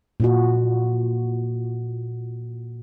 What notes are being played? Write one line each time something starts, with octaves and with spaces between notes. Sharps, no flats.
A#2 F4 F#4